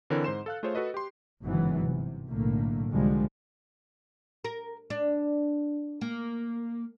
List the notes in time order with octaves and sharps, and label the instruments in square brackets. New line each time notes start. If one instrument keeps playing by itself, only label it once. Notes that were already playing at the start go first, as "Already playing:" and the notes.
[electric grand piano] D3 E3 C4 E4 A#4 C#5
G#2 C5 C6 E7
A4 F5 F#6
A3 F4 G#4 C5 C#5
F#4 A4 B4 D#5
G4 C6
[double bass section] G1 G#2 C#3 E3 F#3 B3
C3
B1 A2 D3 A3 A#3
C2 D3 F3 G3 G#3
[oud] A#4
D4
A#3